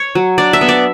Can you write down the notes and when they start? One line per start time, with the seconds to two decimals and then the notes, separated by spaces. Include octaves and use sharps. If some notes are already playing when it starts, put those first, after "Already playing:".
Already playing: C#5
0.15 F#3
0.38 D4 D5
0.53 E5
0.61 B3
0.69 D5